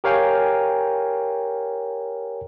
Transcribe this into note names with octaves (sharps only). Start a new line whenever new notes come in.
G4 A#4 C#5 F5 G5 G#5